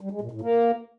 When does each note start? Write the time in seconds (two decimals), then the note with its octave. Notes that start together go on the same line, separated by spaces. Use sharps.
0.01 G3
0.11 G#3
0.21 A#2
0.31 A2
0.41 A#3